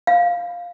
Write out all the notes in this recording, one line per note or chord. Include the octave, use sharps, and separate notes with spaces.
F5